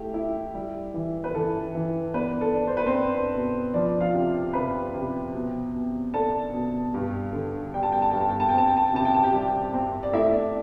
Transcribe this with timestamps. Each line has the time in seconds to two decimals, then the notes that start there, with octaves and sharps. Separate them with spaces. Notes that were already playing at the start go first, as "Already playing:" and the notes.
Already playing: A3 E4 G4
0.14 E4
0.55 G3
0.94 E3
1.24 B4
1.34 E3 A4
1.75 E3
2.14 B3 D4 B4
2.41 A4
2.54 D4
2.67 C5
2.77 B4
2.86 C4 C5
2.94 D4
3.34 B2
3.74 F3 D4 D5
4.00 F4 F5
4.14 C3
4.53 C3 B4 B5
4.94 C3
5.34 B2
5.74 B2
6.14 D4 A4 A5
6.53 B2
6.94 G2
7.33 D3
7.74 G3 G5
7.83 A5
7.92 G5
8.02 A5
8.11 G2 G5
8.21 A5
8.30 G5
8.40 A5
8.49 G5
8.54 C4 A5
8.68 G5
8.77 A5
8.86 G5
8.93 C3 A5
9.05 G5
9.15 A5
9.23 G4 G5
9.33 G3
9.74 C4
10.03 D5
10.13 A3 E4 E5
10.32 D4 D5